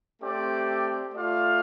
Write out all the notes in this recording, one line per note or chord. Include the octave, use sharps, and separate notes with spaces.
A3 C4 G4 D5
A3 F4 D5 F5